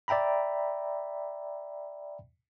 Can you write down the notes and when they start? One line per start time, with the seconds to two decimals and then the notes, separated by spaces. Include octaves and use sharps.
0.08 D5 E5 G5 A#5 B5